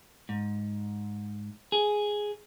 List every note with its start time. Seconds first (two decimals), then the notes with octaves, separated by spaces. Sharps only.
0.29 G#2
1.72 G#4